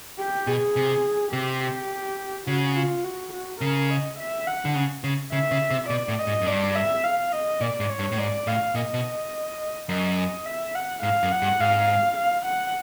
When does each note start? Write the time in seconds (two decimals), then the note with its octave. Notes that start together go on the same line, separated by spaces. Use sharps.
0.18 G4
0.47 B2 G#4
0.76 C3
1.33 C3 G4
2.47 C#3 F#4
2.76 F4
3.04 F#4
3.33 F#4
3.61 C#3 A#4
3.90 D#5
4.19 E5
4.47 F#5
4.65 D3
4.75 C#3
5.04 C#3
5.32 C#3 E5
5.51 C#3
5.70 C3
5.90 B2 D5
6.08 A2
6.19 D#5
6.27 G#2
6.41 F#2
6.46 G2 D5
6.75 E5
7.04 F5
7.32 D#5
7.61 A#2 D5
7.80 G#2
7.89 C#5
7.99 G2
8.12 A2
8.18 G#2 D5
8.47 A2 F5
8.75 A#2 D#5
8.94 B2
9.89 F#2 D#5
10.17 D#5
10.46 E5
10.75 F#5
11.03 G#2 F5
11.23 F#2
11.31 F#5
11.42 G2
11.60 G#2 F5
12.17 F5
12.46 F#5